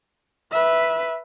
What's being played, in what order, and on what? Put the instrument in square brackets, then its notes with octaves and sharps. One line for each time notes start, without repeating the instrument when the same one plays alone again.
[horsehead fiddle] B4 E5